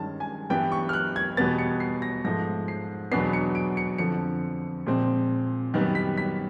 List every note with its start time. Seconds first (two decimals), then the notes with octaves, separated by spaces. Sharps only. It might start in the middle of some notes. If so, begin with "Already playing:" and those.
Already playing: G2 D#3 G#3 C#4 A5
0.20 G#5
0.50 G2 E3 G3 B3 G5
0.72 C#6
0.89 F6
0.93 F#6
1.16 G#6
1.37 E2 B2 G3 B3 A6
1.58 C#7
1.80 C7
2.02 A#6
2.24 G#2 F3 A3 A#6
2.68 C7
3.11 E2 B2 F#3 B3 D4 C7
3.33 C#7
3.55 D7
3.77 C#7
3.98 F2 D3 F3 C#7
4.86 A#2 F3 G#3 C4
5.74 F#2 D#3 G3 B3
5.95 B6
6.18 B6